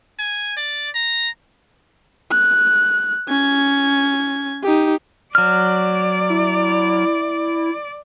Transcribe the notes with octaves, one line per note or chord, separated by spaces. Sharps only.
G#5
D5
A#5
F#6
C#4 G#6
D#4 G4
F#3 D5 F6
E4